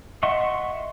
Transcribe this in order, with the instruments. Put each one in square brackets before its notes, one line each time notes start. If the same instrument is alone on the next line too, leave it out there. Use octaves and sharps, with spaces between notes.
[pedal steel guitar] D#5 E5 F#5 C6 C#6